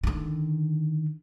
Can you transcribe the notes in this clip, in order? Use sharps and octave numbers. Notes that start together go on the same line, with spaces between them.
D3 D#3